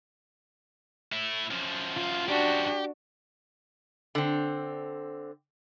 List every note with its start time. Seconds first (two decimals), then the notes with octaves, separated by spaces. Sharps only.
1.12 A3 E4
1.51 F#2 F3
1.97 F4
2.28 D4 F#4 G4
4.15 D3 C4